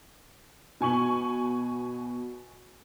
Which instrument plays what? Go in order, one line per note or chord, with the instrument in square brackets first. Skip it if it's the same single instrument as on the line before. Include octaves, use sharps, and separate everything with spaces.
[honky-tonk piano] B2 G#5 C#6 F#7